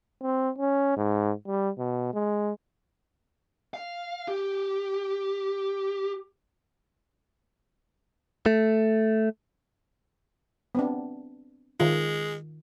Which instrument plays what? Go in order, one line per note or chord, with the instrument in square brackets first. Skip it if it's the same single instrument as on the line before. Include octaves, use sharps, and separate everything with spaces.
[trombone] C4
C#4
G#2
G3
B2
G#3
[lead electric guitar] F5
G4
[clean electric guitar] A3
[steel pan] B3 C4 D4
[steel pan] D#3 F4 [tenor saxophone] G#3